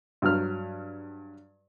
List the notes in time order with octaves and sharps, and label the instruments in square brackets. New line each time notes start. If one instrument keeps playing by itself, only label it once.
[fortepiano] G2 F#3 F6